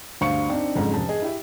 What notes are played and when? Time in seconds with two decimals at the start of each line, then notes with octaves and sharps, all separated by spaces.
0.21 D2 G2 C5 F5 C#6 C#7
0.49 C4 D4 D#4
0.75 F#1 F2 G#2
0.94 F1 A5
1.09 G#4 D#5
1.22 E4 G4 E5